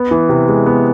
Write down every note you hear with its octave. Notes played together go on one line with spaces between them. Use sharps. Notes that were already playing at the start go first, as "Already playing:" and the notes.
Already playing: B3
E3
C3
G#3
B3